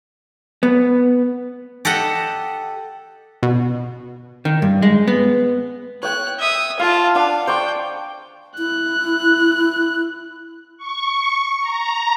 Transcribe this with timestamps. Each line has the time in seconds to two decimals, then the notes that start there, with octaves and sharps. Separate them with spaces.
0.63 B3
1.85 G4 A4 D#5 F#5
3.43 B2
4.45 D#3
4.62 G2
4.82 G#3
5.08 B3
6.03 C#5 G5 F#6
6.39 E5 D#6
6.79 F4 F5 A5
7.15 D4 F5 F#5
7.47 C5 D5 G5 C#6
8.58 E4 F#6
10.77 C#6
11.61 A#5